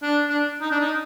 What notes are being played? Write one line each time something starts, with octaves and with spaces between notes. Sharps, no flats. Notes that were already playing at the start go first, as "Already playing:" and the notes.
D4
D4
D#4
D4
D#4